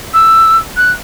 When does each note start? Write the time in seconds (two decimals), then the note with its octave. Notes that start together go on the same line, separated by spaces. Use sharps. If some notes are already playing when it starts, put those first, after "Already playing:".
0.14 E6
0.77 F#6